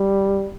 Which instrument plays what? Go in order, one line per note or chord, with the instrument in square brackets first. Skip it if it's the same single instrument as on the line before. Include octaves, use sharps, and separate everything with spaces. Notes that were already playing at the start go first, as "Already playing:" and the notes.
Already playing: [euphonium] G3